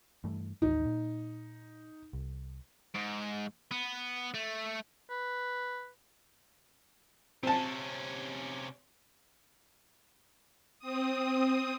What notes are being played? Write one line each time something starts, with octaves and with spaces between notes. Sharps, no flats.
G2 E3 A3
A1 D#2 D#4
A#2
C2
G#2
B3
A3
B4
C3 C4 C#4 A5
C4 D#6